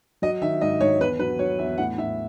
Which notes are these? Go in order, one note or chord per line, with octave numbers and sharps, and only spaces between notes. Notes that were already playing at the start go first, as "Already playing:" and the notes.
F#3 D#5
D#3 E5
G#2 D#5
G#2 C#5
E2 B4
F#3 B4
F#3 C#5
E2 E5
A2 F#5
A2 E5